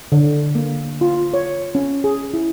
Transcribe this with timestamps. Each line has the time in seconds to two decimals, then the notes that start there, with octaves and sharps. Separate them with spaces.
0.12 D3
0.55 A#3
1.01 F4
1.34 C#5
1.75 C#4
2.04 G#4
2.34 E4